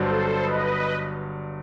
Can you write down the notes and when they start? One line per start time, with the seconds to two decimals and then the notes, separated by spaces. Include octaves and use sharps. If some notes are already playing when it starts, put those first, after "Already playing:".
Already playing: G1 G2 F#3 A4 C5
0.41 B4 D#5